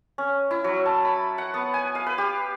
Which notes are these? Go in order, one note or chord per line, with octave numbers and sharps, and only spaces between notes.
C#4
E4
F#3
A5
B5
F#5
B3
G#5
F5
B4
G4